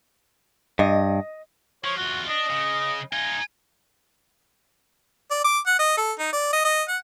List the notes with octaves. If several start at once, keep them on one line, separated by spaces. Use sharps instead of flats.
G2 D#5
F3 C#5
E2 F4 F#4
D4 D#5
C#3
D#4 F4 G#5
D5
D6
F#5
D#5
A4
D#4
D5
D#5
D#5
F#5